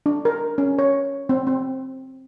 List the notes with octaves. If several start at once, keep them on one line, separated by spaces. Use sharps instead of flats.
D4
A#4
C#4
C#5
C4
C4